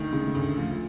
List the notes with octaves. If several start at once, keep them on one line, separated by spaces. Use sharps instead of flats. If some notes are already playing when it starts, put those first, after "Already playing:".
Already playing: D2 D#3
C#3
D2
F3